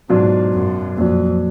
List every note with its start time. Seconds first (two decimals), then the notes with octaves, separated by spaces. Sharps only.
0.09 G#2 B2 F#3 D4 F4
0.53 F#2
0.97 F2 A#2 F#3 D4